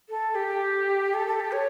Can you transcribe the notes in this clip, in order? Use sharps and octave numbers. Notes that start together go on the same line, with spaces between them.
A4
G4
A4
A4
G4
C#5